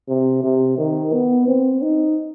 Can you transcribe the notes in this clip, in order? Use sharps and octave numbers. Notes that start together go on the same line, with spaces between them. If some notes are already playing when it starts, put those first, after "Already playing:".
C3
C3
D#3
B3
C4
D#4